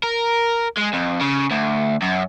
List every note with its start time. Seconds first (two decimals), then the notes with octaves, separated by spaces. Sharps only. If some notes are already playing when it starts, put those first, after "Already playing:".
0.03 A#4
0.77 G#3
0.93 F2
1.21 C#3
1.51 D2
2.02 F#2